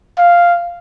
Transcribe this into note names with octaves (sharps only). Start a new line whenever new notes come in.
F5